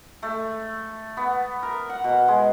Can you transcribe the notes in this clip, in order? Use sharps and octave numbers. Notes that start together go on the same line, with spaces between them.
A3
B3
A#4
F#5
B2
G#3